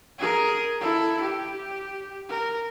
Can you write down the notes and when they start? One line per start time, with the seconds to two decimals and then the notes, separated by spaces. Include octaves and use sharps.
0.18 G#4 A#4
0.80 E4 A4
1.21 G4
2.29 A#4